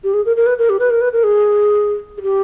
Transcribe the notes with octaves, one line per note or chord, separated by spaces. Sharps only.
G4
G#4
A#4
A#4
B4
A#4
G4
B4
A#4
B4
A#4
G#4
G#4
G4